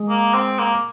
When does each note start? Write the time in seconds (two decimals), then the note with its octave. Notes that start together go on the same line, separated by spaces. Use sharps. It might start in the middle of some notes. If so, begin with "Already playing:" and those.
Already playing: G#3
0.09 A#3
0.34 C4
0.59 A#3